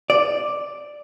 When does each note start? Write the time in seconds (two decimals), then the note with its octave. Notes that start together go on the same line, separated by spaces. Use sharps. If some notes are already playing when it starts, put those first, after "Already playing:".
0.10 D5